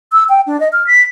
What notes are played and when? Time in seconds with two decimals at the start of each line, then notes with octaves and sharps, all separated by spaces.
0.12 E6
0.29 G5
0.47 D4
0.60 D#5
0.73 F6
0.87 B6